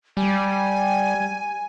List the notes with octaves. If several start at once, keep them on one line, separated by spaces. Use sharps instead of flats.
G3 G#5